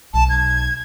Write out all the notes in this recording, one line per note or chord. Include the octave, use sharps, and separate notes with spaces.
B1 A5
G#6